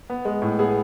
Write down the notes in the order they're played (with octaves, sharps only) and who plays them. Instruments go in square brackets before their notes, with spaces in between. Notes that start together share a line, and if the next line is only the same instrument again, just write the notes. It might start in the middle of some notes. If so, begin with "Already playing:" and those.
[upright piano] B3
G#3
A2
B3 G#4